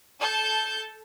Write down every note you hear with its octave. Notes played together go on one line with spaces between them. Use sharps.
A4 A5 G6